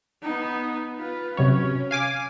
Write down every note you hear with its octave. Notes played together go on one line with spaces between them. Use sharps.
B3 D#4
F4 B4
C3 F#3 C#4 C#5
F5 G#5 D6